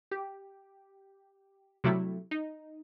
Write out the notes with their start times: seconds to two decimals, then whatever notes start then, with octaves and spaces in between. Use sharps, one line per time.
0.11 G4
1.84 C3 F#3 G3 A3 E4
2.31 D#4